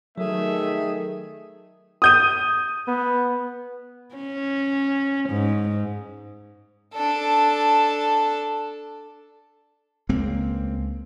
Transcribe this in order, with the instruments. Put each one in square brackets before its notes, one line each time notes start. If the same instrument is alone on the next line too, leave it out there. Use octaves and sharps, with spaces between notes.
[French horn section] D#3 A3 [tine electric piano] F#3 [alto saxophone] G#4 [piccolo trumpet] E5
[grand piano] D#6 G6 D#7
[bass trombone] B3
[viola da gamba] C#4
G#2
[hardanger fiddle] D4 A4
[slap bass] C#2 G#3 A#3 C4